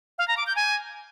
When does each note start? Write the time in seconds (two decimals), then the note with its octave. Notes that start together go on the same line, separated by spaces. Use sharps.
0.18 F5
0.28 A#5
0.37 D6
0.47 G6
0.56 G#5